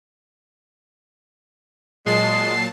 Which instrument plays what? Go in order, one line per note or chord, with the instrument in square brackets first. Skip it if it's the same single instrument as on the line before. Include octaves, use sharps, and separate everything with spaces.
[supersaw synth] A#2 F#3 A5 [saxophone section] G#3 [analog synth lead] C7